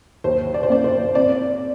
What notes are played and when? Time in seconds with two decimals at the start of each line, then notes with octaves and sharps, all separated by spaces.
0.24 D#2 C5
0.54 D5
0.63 C5
0.70 A#3 D5
0.84 C5
1.15 C4 D5